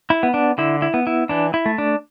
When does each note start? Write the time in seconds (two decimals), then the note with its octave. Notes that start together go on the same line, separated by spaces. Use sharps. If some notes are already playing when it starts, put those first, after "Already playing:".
0.10 E4
0.23 B3
0.34 D4
0.58 D3 E4
0.82 E4
0.94 B3
1.07 E4
1.29 E3 D4
1.54 E4
1.66 A3
1.78 D4